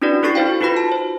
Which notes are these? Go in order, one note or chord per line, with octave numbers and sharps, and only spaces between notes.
C#4 D4 E4 F#4 B4 D5
E4 F#4 A4 C#6 A6 C7
D#4 F#4 C5 F5 G5
D#4 F4 F#4 B4 B5 A#6
A5
C5